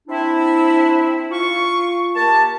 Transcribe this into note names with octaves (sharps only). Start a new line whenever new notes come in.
C4 D4 E4
F4 C#6
A#3 G4 A5